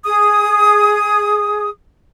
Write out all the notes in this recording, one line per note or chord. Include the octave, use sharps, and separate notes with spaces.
G#4 D#6